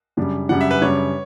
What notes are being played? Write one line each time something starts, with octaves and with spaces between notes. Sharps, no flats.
F#2 C#3 G3 D4
F#2 C#3 G3 D4 F#5
E5
B4
F#2 C#3 G3 D4 C#5